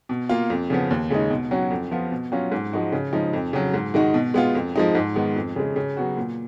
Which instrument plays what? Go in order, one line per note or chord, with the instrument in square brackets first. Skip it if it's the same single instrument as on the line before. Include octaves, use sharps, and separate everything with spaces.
[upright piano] B2
A#3 F4
F2
C#3 F3 B3
D#2
C#3 G#3 D#4
B2
F#3 C#4 F#4
F2
F3 B3 F4
B2
F#3 C#4 F4
G#2
F3 G#3 D#4 F#4
C#3
F3 G#3 D#4
F2
C#3 F#3
G#2
D#3 G#3 D#4 F#4
B2
G#3 B3 F4
F2
F3 G#3 D#4
G#2
D#3 G#3 B3
F2
C#3 G#3
C#3
F#3 B3 F#4
A#2